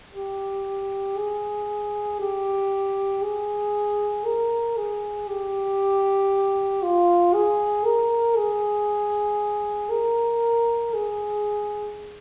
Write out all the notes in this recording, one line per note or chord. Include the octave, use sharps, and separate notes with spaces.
G4
G#4
G4
G#4
A#4
G#4
G4
F4
G#4
A#4
G#4
A#4
G#4